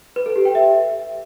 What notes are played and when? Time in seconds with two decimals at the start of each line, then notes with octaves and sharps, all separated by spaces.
0.16 B4
0.26 A4
0.36 G4
0.45 G5
0.55 E5